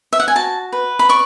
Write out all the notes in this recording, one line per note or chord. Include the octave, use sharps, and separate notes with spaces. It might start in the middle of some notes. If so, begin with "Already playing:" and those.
E5
F#5
G#5
F#4 A5
B4
B5
D5 C#6